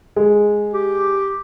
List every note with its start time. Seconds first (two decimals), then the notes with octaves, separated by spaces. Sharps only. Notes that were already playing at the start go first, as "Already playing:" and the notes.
0.16 G#3
0.74 G4